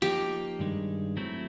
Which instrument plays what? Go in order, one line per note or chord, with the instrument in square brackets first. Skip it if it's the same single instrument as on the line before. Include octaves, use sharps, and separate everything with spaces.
[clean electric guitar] F3 A#3 D#4 [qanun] G4
[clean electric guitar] G2 D#3 G#3
F#3 A3 C4 E4